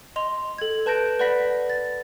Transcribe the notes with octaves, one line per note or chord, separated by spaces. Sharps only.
D#5 C6 F7
A4 G#6
B4 A5 G6 A#6 D7
B4 D5 F#5 B5 A#6 B6
A6